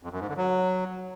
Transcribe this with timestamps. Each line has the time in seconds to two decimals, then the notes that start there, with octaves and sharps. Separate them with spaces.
0.03 F2
0.12 F#2
0.20 G#2
0.28 D3
0.37 F#3